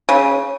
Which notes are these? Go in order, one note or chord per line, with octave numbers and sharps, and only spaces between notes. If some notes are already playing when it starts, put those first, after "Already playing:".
C#3